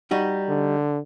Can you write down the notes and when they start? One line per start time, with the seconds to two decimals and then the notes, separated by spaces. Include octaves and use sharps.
0.11 G3 D#4 F#4
0.49 D3